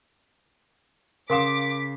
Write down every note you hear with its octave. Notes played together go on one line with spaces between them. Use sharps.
C#3 A#4 F5 C6 D6 D#6 B6 E7